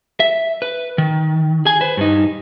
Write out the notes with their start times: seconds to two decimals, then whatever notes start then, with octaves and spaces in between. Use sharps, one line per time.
0.20 E5
0.62 B4
0.98 D#3
1.65 G#4 G#5
1.81 B4 C5
1.97 G2 D#4